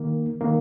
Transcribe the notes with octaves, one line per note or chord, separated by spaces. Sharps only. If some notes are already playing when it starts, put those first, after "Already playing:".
Already playing: D#3 A#3
D#3 A#3